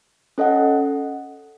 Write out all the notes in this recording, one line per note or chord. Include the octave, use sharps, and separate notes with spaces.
C#4 A4 D#5 F#5